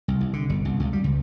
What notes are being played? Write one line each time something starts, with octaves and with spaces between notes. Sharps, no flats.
C2
C2
D3
G1
C2
C#2
G3
C#2